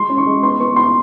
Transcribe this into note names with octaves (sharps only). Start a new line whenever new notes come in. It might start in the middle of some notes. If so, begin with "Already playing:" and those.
Already playing: G#3 C6
C#4
C#6
G#3
B3 C6
B3 C#6
B3 C6